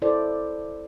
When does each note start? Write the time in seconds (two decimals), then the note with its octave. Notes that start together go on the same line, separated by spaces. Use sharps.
0.02 E4 A4 C5 D5